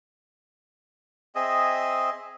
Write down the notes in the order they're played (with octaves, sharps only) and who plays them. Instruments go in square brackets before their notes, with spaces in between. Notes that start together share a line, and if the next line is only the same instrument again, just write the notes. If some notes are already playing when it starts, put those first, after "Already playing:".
[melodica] C4 G#4 D#5 E5